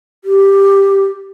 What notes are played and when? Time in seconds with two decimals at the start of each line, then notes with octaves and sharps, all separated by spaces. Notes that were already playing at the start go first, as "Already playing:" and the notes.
0.25 G4